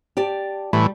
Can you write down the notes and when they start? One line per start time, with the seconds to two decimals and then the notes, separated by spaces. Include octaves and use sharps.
0.17 G4 D5 A5
0.73 A2 E3 G3